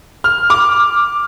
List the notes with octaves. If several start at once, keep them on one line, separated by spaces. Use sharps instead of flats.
F6
D6 F6